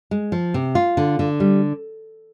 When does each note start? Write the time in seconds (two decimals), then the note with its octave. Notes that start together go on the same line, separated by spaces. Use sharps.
0.11 G#3
0.32 F3
0.54 C3
0.75 F4
0.97 D3
1.19 D3
1.40 G3